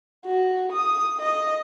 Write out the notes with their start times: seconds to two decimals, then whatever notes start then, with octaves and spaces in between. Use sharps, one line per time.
0.26 F#4
0.73 D#6
1.20 D#5